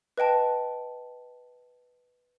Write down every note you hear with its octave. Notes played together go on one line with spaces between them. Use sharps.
B4 D#5 G5 A5